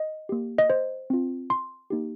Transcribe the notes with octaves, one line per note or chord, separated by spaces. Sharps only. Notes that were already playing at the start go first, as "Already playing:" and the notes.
Already playing: D#5
A#3 G4
D#5
C5
C4 F4
C6
A#3 D#4 G4